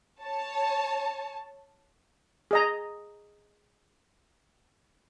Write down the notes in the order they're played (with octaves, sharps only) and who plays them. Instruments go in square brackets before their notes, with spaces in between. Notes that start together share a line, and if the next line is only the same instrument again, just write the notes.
[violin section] C#5 A5
[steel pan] G#4 D#5 A#5